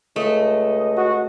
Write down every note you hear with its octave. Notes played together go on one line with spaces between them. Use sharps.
C#2 A3 D#5
F#4